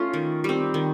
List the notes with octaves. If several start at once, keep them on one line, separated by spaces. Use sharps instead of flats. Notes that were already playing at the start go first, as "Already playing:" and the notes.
Already playing: A3 C#4 F4
D#3
G3 C4
D#3